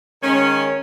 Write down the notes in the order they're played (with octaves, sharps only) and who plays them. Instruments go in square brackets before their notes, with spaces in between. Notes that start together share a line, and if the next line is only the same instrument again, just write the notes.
[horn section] D#3 G#3 C#4